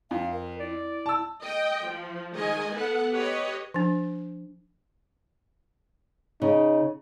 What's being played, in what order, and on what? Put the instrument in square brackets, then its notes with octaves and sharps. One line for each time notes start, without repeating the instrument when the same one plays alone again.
[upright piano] F2 [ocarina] F5
[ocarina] A#4
[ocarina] E4 [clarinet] D5
[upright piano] A5 E6
[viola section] D#5 G5
F3
D#3 G#3 D#5 G#5
B3 A4 B4 F#5
G4 B4 C#5 D#5
[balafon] F3 D4
[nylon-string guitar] C#3 [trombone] D#4